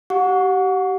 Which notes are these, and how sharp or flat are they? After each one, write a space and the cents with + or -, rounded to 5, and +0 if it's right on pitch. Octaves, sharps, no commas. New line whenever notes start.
G4 -30 F#5 -25 C#6 +35